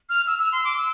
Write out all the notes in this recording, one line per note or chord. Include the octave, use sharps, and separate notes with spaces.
F6
E6
E6
C6
D6
E6